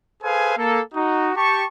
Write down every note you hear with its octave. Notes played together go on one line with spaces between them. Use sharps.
G#4 A4 B4 C5 F5 G#5
A#3 A4
D#4 F#4
G4 A5 C#6